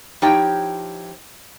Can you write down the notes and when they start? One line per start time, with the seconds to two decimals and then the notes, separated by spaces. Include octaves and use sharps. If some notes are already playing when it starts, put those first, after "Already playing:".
0.22 F3 D#4 E4 G4 C#5 G5